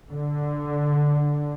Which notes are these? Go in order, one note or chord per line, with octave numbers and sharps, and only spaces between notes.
D3